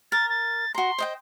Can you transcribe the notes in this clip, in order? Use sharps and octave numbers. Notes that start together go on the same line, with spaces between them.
A#4 A6
A6
F#4 A#5 C6
C5 D#5 G5